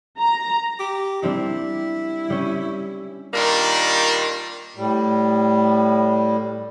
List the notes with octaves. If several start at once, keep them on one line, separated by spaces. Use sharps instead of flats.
A#5
G4
G3 C4 D4 E4
G3 C#4
A#2 D#3 G3 A#3 D4
A2 G3